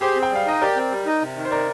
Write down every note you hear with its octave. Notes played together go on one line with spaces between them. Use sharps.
G4 G#4 C5
C4
G5
G3 F5
D#4 D#5
G4 A#4 D5
C4
G3
D#4
C3
D#3
C5
C3 A#4 D5